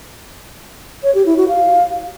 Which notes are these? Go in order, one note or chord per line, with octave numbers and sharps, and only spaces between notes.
C#5
G4
E4
F#4
F5